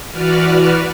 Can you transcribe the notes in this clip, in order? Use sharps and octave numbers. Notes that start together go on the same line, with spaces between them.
E3 F#4 B4 D5 F6